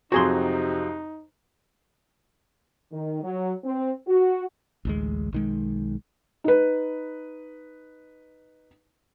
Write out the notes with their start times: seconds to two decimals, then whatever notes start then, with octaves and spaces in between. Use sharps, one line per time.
0.12 F2 C3 F#3 D#4 F#4 G#4 C6
2.93 D#3
3.23 F#3
3.65 C4
4.07 F#4
4.85 A1 D2 G#3
5.33 B1 D#3 G#3
6.44 D#4 B4